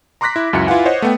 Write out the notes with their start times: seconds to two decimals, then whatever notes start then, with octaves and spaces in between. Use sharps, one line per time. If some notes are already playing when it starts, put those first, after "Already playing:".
0.21 A#5 C6 D6 F#6 A#6 B6
0.36 E4
0.53 C#2 F#2 E4 F#4 C#7
0.67 E4 F4 B4 F5 F#5 G#5
0.85 C5 C#5 D#5 F#5
1.02 A3 B3 G5